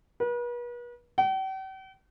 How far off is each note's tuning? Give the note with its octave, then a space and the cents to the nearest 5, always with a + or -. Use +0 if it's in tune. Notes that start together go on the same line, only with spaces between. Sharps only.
B4 -40
G5 -45